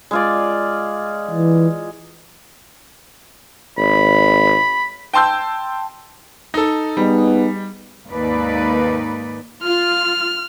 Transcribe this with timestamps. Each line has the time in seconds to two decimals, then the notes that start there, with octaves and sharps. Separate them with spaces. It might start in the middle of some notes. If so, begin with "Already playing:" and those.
0.11 G#3 F4 D5
1.31 E3
3.78 G#1 B5
5.13 G5 A5 C6 E6 G6
6.54 D#4 A4
6.97 G3 B3 D#4 G#4
8.08 D#2 G#2 A#3 D#4 B4 D5
9.63 F4 F6